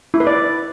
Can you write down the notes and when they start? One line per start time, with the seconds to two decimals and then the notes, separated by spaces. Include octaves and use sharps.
0.14 E4
0.20 B4
0.27 D5